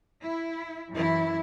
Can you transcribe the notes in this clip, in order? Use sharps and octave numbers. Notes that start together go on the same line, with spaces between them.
E4
F#2 E3 E4